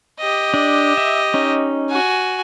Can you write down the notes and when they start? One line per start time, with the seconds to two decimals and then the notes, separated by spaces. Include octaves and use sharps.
0.20 G4 D#5
0.54 D4
0.98 E5
1.34 C#4 D#4
1.90 F#4 G#5